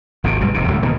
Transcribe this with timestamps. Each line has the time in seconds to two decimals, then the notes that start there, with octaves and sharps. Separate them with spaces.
0.24 G#1 D#2 C3
0.41 B1 G2 B2 G#3
0.54 F1 D#2 C3
0.68 D2 A2 D3 G3
0.82 G2 B2 D#3 A#3